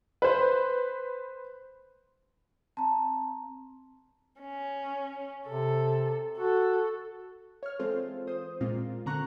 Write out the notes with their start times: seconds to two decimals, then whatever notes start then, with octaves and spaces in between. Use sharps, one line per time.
0.22 B4 C5
2.77 C4 A5 A#5
4.41 C#4
5.48 C3 A4
6.38 F#4 A4
7.63 C#5 F6
7.79 E3 G#3 C4 F4 A4 C5
8.27 C5 D#6
8.61 A#2 G#3 A#3 C4 F4
9.06 D3 C4 A#5 C#6 F#6